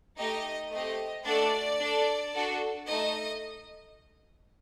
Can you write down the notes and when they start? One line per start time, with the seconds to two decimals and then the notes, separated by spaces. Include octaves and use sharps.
0.17 A3 D#4 G4 D#5
0.72 A3 C4 G4 D#5
1.26 A3 D4 F#4 A4 D5
1.81 D4 A4
2.34 D4 F#4 A4
2.89 A3 D#4 A4 D#5